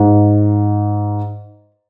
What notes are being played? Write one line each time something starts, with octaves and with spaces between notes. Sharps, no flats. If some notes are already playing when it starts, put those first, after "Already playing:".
Already playing: G#2